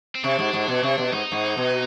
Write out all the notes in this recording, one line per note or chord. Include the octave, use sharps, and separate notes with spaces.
C4
C3 D4
G#2
G#2
B2
C3
B2
G#2 D#4
G#2
B2